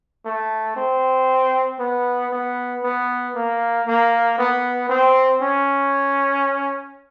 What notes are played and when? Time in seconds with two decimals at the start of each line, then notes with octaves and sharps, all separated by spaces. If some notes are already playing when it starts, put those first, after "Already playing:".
0.25 A3
0.77 C4
1.79 B3
2.32 B3
2.84 B3
3.35 A#3
3.87 A#3
4.38 B3
4.89 C4
5.42 C#4